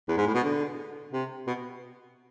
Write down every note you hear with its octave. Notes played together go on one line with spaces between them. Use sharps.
E2
G#2
A2
B2
D3
C3
B2